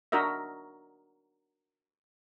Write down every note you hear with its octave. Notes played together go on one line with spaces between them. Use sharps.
D4 F#4 A#4 D#5 E5